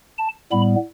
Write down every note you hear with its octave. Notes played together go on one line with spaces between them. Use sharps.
A5
A2 G3 B3 B5